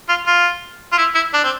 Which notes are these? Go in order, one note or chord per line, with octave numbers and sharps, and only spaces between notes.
F4
F4
F4
E4
E4
D4
C4